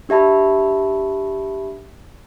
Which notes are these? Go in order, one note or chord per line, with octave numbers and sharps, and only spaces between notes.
D4 G4 E5 A5 B5